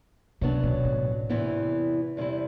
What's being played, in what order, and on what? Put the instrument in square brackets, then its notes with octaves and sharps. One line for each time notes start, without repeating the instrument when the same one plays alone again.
[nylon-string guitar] F#2 F#3 B3 D4 [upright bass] C3
[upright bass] B2
A2
[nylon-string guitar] E2 C3 E3 B3
E2 C3 G3 C4 E4